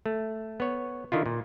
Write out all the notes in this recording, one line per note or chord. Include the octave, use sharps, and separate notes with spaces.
A3
B3 C#5
D3 D#3 E4 F4
A#2